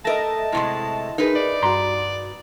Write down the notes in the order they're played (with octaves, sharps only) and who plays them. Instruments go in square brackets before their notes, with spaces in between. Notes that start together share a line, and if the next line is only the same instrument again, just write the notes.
[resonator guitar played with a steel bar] A3 A#4 [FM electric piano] D#5 E5 A#6 [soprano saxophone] A5
[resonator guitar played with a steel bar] A2 C3 G#3
[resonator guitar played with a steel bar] D#4 B4 [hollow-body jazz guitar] G#4 A#4
[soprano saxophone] D5
[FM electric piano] G2 F#4 [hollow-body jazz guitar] A#5 C6